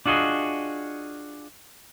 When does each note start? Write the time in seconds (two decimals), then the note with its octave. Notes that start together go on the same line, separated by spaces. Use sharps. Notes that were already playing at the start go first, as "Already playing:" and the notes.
0.06 D4 F4 F#4 G#4 D#5